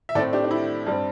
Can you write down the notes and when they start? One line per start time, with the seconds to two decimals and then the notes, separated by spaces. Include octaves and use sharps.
0.09 E5
0.15 A2 A3 C4 A4 D5
0.33 D4 G4
0.44 D4
0.51 E4
0.86 G2 G3 C4